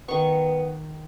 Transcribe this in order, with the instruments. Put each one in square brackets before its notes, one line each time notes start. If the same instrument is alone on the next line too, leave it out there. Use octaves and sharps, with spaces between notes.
[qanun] D#3 C#6 [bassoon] B3